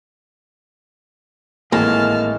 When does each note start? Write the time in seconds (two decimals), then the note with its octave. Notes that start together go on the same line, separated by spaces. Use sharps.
1.72 G#1 A2 E3 G#3 A#3 A5 F6